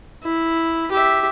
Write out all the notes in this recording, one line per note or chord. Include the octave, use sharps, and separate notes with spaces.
E4
G4 E5